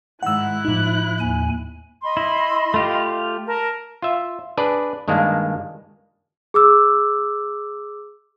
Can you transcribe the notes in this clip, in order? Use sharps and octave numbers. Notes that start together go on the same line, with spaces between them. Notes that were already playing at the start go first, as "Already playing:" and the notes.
G#2 D#3 E4 F#5 E6 F#6
A2 F3 D#4
D#2 G#5
D#5 B5 C6
E4
A3 F4 G4
A#4 A5
F4 E5
D4 G#4 B4 D5
G2 D#3 G#3 A#3 D4
G#4 D6 E6